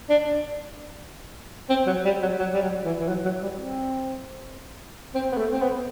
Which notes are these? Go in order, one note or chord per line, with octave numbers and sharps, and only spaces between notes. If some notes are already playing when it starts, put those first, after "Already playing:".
D4
C4
F#3
G3
F#3
F#3
G3
F#3
E3
E3
F#3
F#3
G3
C4
C4
B3
A3
C4
B3